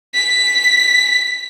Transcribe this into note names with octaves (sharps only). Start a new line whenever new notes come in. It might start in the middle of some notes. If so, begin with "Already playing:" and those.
B6